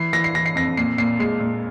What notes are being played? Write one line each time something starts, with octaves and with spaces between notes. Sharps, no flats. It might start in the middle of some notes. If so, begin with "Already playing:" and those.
Already playing: E3 C7
E3 A#6
C7
E3 A#6
C7
F2 A#6
A#2 C7
A#2 C7
G#3 C7
A#2